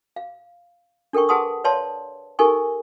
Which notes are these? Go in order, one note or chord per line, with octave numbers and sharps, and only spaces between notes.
F5
D4 A4 A#4 G5 C#6
G#4 B4 F#5 A5 C6 D#6
B4 C#5 D5 F5 A5 C6
D#4 G4 A4 A#4 G#5 C#6